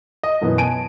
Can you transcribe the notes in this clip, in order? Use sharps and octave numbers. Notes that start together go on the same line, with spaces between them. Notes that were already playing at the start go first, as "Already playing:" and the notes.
D#5
F#2 B2 E3 B3
G#5 A5 D7 D#7